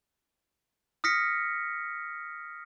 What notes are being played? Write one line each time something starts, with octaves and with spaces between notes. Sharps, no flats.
D#6 F6 A#6 B6 C#7